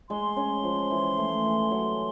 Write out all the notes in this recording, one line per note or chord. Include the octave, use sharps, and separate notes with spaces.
G#3 C6
C#4
F3
E3
A3
E3
F#3